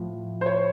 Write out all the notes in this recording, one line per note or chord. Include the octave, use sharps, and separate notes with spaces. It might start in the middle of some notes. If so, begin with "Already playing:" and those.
Already playing: A2 F3
C5
C#5